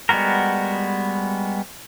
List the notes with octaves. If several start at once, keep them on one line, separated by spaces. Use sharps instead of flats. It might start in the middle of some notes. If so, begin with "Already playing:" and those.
G3 G#3 B3 F#4 A#4